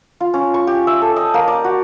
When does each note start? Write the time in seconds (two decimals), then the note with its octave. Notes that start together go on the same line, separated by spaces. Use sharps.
0.20 F4
0.34 C#4
0.54 C#6
0.67 G4
0.87 E5
1.02 A4
1.16 D#5
1.34 A#3
1.48 D5
1.64 F#4